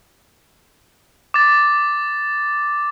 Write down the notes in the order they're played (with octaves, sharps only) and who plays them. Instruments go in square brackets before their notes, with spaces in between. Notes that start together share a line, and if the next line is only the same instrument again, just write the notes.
[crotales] D6 A6